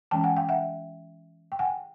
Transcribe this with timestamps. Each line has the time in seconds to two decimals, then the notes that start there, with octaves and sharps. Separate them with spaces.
0.11 E3 G#3 C#4 G5 A5
0.24 F#5 G#5
0.37 F5 G5
0.49 E5 F#5
1.52 G5
1.59 F#5 G#5